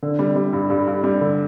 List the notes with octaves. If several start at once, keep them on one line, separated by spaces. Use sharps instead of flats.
D3
G3
G3
G2
G2
G2
G3
D3